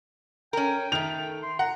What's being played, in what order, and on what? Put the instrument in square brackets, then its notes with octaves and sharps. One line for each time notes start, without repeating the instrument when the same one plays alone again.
[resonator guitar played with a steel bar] C#4 A#4 [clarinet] G5
[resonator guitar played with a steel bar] D#3 A3 [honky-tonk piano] F7
[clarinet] C6
[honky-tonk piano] F#5 [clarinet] A#5